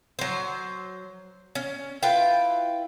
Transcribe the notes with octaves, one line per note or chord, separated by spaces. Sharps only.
F#3 C5
C#4
E4 F4 B4 G5